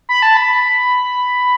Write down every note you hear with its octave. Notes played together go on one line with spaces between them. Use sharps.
B5
A5
B5